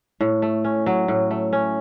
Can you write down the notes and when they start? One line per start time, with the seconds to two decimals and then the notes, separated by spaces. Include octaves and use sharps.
0.21 A2
0.42 A3
0.64 C#4
0.86 F#3
1.08 A2
1.31 A3
1.53 C#4